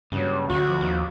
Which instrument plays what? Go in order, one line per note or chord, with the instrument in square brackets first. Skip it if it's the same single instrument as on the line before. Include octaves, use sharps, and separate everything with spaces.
[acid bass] G2 [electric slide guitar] C#3 F#3
[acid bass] D2 [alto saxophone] F#4
[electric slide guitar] F2 F3
[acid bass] D#2